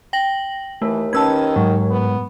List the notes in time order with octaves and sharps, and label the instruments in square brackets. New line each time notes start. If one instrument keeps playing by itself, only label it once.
[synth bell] G5 A#6 F#7
[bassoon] D#2 [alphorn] E3 [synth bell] A3
[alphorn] D#3 [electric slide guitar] C#4 B4 [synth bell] A5 E6 G#6
[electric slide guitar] G#2 [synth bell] F#3
[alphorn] B3